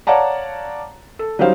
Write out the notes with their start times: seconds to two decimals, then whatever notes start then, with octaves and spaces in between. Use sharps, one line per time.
0.07 C#5 D5 F5 F#5 A5 A#5
1.19 A4
1.39 F#3 G3 C#4 D#4 C5 F5